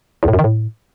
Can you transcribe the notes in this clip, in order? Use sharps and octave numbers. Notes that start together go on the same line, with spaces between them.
E2
A2
F#2
D#3
A2